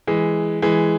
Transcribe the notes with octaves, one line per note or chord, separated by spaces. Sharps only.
E3 G#3
E3 G#3